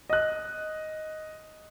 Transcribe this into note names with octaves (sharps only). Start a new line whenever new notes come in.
D#5 F#6